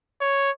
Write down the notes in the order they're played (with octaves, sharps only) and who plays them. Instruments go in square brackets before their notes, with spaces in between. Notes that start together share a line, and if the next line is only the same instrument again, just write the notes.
[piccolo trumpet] C#5